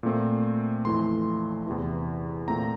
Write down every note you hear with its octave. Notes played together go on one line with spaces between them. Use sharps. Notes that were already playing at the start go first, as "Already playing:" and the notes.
A#2 A3 C4
F2 E3 A3 C6
E2 C3 E3
A#2 A3 C4 A#5